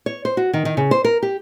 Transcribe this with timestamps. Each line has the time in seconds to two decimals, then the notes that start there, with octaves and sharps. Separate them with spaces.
0.06 C#5
0.25 C5
0.37 F#4
0.53 D#3
0.65 D#3
0.77 C#3
0.91 C5
1.04 A#4
1.23 G4